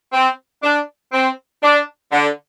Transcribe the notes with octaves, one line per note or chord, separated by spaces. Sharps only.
C4
D4
C4
D4
D3